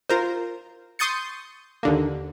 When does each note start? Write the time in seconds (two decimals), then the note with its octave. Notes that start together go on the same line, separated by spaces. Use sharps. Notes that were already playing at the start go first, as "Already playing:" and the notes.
0.10 F4 A#4 C5
0.99 C6 C#6 D#6 G6 A6 C#7
1.83 D#2 D3 A#3